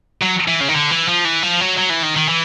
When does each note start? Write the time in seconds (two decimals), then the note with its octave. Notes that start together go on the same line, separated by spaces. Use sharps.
0.22 F#3
0.48 E3
0.61 C#3
0.69 D#3
0.74 D3
0.91 E3
1.08 F3
1.25 E3
1.43 F3
1.60 F#3
1.77 F#3
1.89 E3
2.03 D#3
2.16 D#3
2.29 E3